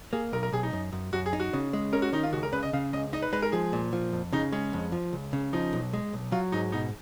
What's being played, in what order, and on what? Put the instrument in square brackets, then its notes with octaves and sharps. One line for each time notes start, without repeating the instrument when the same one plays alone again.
[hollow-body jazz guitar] A#3 [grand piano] G#4
[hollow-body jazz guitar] B1 [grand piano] A#4
[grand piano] A#4
[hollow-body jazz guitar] B1 [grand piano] G#4
[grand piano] D#4
[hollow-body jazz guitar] F#2
F#2
[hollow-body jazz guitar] F#2 [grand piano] F#4
[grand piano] G#4
[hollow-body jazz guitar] D#4
[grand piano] F#4
[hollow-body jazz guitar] C#3
G#3
[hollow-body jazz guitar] C#4 [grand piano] A#4
[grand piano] F#4
[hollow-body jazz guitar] D#3 [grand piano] D#4
[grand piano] F4
[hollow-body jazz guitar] C#2 [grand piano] F#4
[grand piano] A#4
[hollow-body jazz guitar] C#3 [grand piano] B4
[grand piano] D#5
[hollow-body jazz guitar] C#3 [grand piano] F5
[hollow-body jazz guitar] C#2 [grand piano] D#5
[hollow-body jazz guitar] D#4 [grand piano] D#5
[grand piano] B4
[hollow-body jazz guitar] G#3 [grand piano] B4
[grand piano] A#4
[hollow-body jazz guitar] F3 [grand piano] G#4
[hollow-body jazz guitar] A#2
F3
F2
[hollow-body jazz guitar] C#3 [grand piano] D#4
[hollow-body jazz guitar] G#3 [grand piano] C#4
[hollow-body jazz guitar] F2
F3
C#2
C#3
[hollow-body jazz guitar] F3 [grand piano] D#4
[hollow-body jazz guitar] B1
G#3
B1
[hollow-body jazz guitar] F#3 [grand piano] F4
[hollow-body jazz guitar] G#2 [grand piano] D#4
[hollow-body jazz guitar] B2 [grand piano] D#4